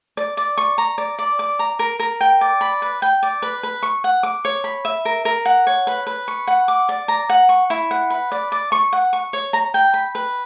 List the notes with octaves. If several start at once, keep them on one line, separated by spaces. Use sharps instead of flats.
D5
D5
C#6
A#5
D5
D5
D6
A#5
A#4
A#4
G5
D5
B5
B4
G5
D5
B4
B4
C#6
F#5
D6
C#5
B5
E5
A#4
A#4
F#5
C#5
B4
B4
C#6
F#5
D6
D5
A#5
F#5
C#6
E4
F#5
B4
D5
D5
C#6
F#5
C#6
C#5
A#5
G5
B5
B4